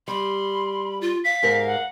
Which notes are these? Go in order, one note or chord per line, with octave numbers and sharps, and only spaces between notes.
G3 B5 C6
F4
F5 B6
G#2 A#4
F#5